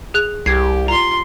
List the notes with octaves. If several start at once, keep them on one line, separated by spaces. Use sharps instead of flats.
G#4 F#6 F7
C2 G4 G#6 C7
F4 A#5 C6